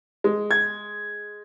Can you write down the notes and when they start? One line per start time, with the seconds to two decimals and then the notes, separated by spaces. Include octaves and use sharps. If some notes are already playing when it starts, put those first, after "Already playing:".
0.24 G#3
0.51 G#6